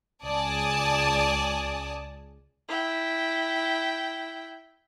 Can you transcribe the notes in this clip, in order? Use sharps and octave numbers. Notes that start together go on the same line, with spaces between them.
C#2 D5 G#5 A5 D#6
E4 G5